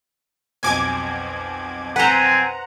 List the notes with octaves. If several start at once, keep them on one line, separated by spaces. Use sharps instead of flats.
B1 F2 B2 G#5 D6 G#6
C4 B4 C5 F#5 G#5 A#5